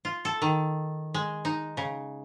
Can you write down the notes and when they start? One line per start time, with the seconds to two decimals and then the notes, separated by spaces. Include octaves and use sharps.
0.05 F4
0.25 A4
0.42 D#3
1.14 G#3
1.45 D#4
1.77 C#3